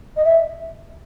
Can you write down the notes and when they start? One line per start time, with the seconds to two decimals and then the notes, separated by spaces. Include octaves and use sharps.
0.16 D#5
0.24 E5